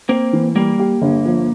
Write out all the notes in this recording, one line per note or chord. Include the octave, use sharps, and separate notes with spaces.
A#3 C4
E3
G3 A#3
G4
G1
F3